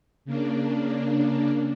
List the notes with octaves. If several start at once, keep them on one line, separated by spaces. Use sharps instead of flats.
C#3 A#3 D4